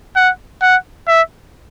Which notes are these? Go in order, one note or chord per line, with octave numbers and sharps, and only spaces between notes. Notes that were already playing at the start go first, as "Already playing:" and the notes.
F#5
F#5
E5